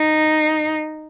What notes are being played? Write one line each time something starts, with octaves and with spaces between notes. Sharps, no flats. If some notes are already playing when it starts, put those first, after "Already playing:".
Already playing: D#4